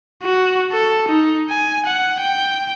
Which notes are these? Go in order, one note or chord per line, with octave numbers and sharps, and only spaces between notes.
F#4
A4
D#4
G#5
F#5
G5